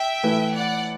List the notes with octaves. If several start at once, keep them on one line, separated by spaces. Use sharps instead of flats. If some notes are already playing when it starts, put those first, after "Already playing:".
Already playing: E5 G5
A2 E3 A3 E4 B4
D5 F#5